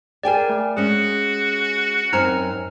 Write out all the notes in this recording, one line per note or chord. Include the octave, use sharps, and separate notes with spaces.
G#4 A#4 D5 G5 G#5
A3
G#3 C#4 F#4 G#4
F#2 C4 C#4 D#4 A#5 F6